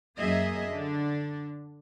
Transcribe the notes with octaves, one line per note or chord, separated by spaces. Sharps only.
F#2 F#3 A#3 G#4 D#5 E5
D3 D4